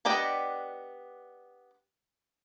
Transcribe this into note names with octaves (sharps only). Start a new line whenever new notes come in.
B3 D4 G4 D#5 G5